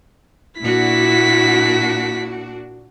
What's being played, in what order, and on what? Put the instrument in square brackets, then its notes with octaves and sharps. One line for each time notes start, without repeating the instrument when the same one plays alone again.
[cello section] A#2 D4 F#4 [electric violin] E4 B6